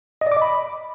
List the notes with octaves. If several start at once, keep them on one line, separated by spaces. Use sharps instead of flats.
D#5
D5
D6
D#5
B5